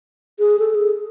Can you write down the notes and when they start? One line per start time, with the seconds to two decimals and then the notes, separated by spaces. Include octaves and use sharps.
0.39 G#4
0.59 A4
0.74 G#4